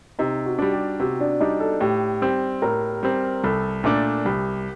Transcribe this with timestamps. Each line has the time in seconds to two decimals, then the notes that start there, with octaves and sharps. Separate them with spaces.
0.19 C3 D#4
0.46 F#4
0.59 G3 D4
0.73 G4
1.00 C3 F#4
1.20 D4
1.40 G3 D4 D#4
1.60 A4
1.80 A2 G4
2.22 G3 C4
2.62 A2 A#4
3.03 G3 C4
3.44 C2 A4
3.84 A#2 A3 D4
4.25 C2 G4